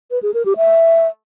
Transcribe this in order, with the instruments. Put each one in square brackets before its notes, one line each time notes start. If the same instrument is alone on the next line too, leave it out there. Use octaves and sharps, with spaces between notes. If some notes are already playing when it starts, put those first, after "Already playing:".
[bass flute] B4
G#4
A#4
G4
E5